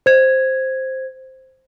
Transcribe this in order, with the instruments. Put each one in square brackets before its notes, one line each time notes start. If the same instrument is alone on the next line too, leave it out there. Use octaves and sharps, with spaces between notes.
[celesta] C5 G#6